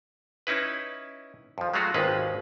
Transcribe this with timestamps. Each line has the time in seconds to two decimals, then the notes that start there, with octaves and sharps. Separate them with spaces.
0.47 C#4 D#4 E4 B4
1.58 F2 F3
1.74 F#3 G#3 A3 F4 F#4
1.94 G#1 D#2 G#3 C#4 F4 B4